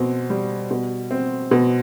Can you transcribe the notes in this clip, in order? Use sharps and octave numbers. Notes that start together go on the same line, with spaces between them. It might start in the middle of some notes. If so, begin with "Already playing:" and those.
Already playing: B2 C4
G3
B2
C4
B2